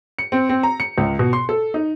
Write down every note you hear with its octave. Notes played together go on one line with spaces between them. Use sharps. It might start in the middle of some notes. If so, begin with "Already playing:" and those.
C#7
C4
C4
A#5
C#7
C#2
B2
C6
A4
D#4